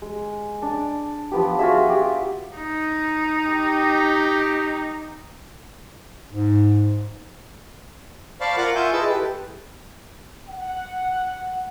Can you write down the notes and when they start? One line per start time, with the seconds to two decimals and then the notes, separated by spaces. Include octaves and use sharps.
0.02 G#3
0.62 D4
1.31 F3 B3 G4
1.59 F4 F#4 G#4 E5
1.89 G4
2.56 D#4
3.48 G4
6.32 G#2
8.41 C5 D5 F5 A5 B5 C#6
8.57 F4 A#4 F5 F#5 D6
8.75 F4 E5 G#5 C#6 G6
8.93 E4 G#4 B4 D#5 A5 E6
9.09 G4 A4 B4
10.49 F#5